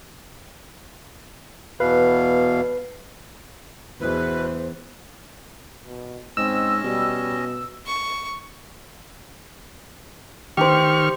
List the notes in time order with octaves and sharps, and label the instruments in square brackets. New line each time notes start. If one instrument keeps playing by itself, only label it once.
[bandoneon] E2 B2 F5 [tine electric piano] B4
[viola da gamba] E2 [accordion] B2 B4 [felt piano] E4 G#4 [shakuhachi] C5
[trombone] B2
[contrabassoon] G#2 [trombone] C4 [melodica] C#4 D#5 [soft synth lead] E6
[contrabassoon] B2 [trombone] G3
[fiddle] C#6
[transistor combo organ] D#3 C#6 F6 [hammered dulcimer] G4 C5